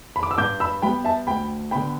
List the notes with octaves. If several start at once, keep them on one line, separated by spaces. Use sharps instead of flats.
B5
D6
E6
G2 D6 G6
B5 E6
G3 B3 G5 B5
E5 A5
D2 G5 B5
D3 B3 G5 B5